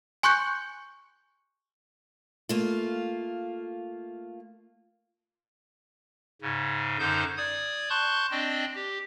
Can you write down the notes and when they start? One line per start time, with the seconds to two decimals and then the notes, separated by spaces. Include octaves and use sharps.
0.23 G#5 C6 C#6 F#6 G6 C#7
2.49 A3 A#3 F4
6.42 G#2 C#3
6.99 F#2 D3 D#4 C5 G6
7.37 D5 D#6 G#6
7.90 A5 C6 C#6 F#6 G6
8.31 C4 D4 D5 D#5 G5
8.75 G4